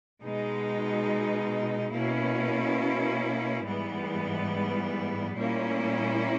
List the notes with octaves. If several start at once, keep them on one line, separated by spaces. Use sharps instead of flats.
B2 G#3 D#4
B2 A#3 C#4 E4
G#2 E3 G3 B3
A#2 G3 A#3 C#4 E4